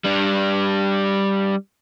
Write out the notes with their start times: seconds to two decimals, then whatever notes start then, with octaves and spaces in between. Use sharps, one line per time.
0.04 G3 D4